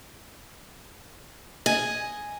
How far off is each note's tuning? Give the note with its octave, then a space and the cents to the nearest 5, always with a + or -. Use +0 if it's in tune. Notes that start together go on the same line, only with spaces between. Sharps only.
D#5 +0 G#5 +0